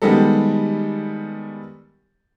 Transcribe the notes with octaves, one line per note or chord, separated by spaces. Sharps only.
D#3 G3 G#3 B3 G4 A4